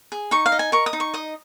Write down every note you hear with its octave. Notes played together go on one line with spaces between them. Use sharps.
G#4
D#4 C#6
F5
D#5
G#5
A#4 C#6
D#6
D#4
C#6
D#5 D#6